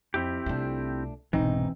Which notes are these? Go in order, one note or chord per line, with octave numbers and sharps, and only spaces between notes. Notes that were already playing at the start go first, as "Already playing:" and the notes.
F2 C4 E4 G4
C2 A3 D4 F4
E1 C2 G#2 E3 C4 D#4